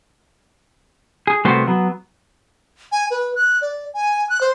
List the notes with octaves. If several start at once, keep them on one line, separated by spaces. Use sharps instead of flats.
G#4
C2 G3 A3 B3 F#4 C5
F#3 B3
G#5
B4
F#6
D5
G#5
F#6
C5